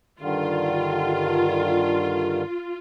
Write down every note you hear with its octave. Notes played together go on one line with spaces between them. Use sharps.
G2 D3 D#3 F4